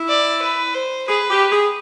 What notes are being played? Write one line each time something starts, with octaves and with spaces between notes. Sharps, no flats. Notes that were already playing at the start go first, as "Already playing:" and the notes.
Already playing: E4
D5
B4
C5
G#4 B4
G4
G#4